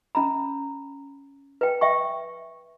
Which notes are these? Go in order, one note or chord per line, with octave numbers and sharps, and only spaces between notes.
C#4 A#5 B5
B4 G5
E5 G5 C#6